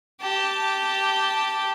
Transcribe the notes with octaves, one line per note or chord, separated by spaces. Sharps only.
G4 A5